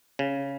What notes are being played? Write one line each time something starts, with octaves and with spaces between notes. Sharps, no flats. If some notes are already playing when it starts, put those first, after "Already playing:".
C#3